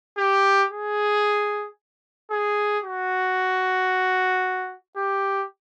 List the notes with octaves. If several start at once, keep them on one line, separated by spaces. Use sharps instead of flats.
G4
G#4
G#4
F#4
G4